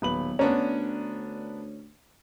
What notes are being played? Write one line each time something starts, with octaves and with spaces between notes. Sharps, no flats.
D#1 B1 B4 F#7
D2 B3 C#4 D4 A#5